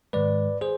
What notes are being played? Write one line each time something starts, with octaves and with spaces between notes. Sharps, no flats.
G#2 D#3 G#3 B4 D5
G#4 C5